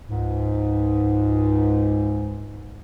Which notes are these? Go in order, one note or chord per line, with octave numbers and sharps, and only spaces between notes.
C#2 G#2